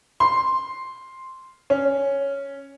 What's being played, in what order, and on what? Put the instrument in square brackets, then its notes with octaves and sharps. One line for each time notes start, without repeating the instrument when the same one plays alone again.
[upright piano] C6
C#4